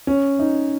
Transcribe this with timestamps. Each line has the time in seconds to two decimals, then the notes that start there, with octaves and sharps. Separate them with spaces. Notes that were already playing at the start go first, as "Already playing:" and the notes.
0.07 C#4
0.39 D#4